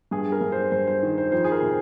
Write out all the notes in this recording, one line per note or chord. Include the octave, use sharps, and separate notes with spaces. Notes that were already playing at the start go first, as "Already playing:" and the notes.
G2 G#4
A#4
G2
C5
G2 C5
C5
D#3
C5
F2 C5
G#4
A#4
C3